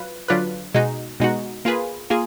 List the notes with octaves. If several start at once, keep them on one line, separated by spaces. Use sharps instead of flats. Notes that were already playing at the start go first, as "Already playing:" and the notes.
Already playing: F#3 F4 B4
D3 F#3 D4 F4 B4
B2 G#3 D#4 F#4
B2 G#3 D#4 F#4
A#3 F4 G#4 B4
A#3 F4 G#4